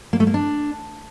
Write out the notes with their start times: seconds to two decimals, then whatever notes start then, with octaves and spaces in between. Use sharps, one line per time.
0.13 A#3
0.20 A3
0.27 A#3
0.34 D4